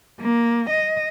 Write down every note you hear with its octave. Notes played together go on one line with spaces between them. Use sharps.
A#3
D#5